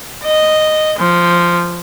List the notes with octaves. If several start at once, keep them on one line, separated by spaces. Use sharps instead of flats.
D#5
F3